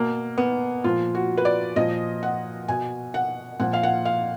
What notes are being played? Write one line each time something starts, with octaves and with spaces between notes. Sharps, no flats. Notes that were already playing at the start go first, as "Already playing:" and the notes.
Already playing: B2 A#3
B3
A#2 F3 F4
F#4
B4
D5
A#2 F3 D#5
F#5
B2 G#5
F#5
A#2 F3 F#5
F5
F#5
F5